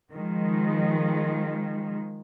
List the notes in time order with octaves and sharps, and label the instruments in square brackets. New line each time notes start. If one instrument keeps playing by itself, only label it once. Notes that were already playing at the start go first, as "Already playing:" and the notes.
[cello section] D#3 F3 G#3